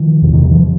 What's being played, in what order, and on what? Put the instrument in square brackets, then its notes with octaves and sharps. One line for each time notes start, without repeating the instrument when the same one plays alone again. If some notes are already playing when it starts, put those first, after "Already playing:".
Already playing: [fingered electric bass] D#3 F3
E2 C3
D#3
E3
F3